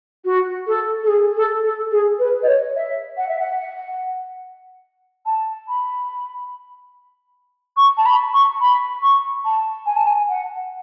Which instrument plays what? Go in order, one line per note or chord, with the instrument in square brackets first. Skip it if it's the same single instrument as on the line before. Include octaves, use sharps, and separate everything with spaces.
[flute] F#4
A4
A4
G#4
A4
A4
G#4
B4
D#5
C#5
E5
F#5
E5
F#5
A5
B5
C#6
A5
B5
C#6
B5
C#6
A5
G#5
A5
G#5
F#5